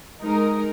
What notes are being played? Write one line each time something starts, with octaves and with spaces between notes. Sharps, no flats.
G#3 D#4 A#4